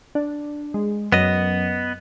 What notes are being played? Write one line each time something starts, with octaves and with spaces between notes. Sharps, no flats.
D4
G#3
F#2 B3 D#5